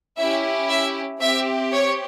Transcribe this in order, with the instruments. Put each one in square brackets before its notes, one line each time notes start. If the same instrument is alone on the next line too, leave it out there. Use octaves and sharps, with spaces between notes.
[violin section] C#4 E4 G4 E5
E5
C4 G4 E5
C#5